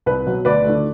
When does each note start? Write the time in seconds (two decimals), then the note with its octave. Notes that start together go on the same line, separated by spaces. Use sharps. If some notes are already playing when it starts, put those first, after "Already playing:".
0.06 C2 B4
0.26 B2 F#3
0.45 D2 B4 D5
0.65 D3 A3